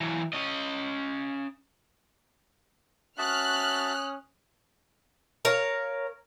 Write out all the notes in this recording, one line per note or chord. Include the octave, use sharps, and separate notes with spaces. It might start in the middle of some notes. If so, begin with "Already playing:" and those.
E3 F#3
C#4 D#5
C#4 F#4 E5 A5 D#6 F6 F#6
A#4 C#5 F5